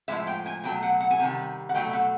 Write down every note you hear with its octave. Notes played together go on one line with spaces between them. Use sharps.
A2 F3 G#3 E5
G5
G#5
B2 F#3 A3 G5
F#5
F#5
G#5
C3 D#3 G3
F#5
B2 F#3 A3 G5
F#5